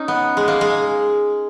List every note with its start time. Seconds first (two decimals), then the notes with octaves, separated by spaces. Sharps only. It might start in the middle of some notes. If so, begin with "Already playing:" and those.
Already playing: C#4 D#4
0.08 B3
0.37 G#3
0.48 A#3
0.61 G#3